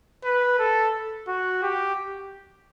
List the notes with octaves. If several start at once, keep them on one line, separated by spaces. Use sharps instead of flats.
B4
A4
F#4
G4